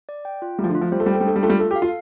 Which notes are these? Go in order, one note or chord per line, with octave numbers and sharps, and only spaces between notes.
D5
G5
F4
G3 A3
F3
D3
F4
F3
G3 C5
A3
G3 G5
A3
G3
A3 D4
G3
A3 F4
G3
A3 A4
G4
F5
F4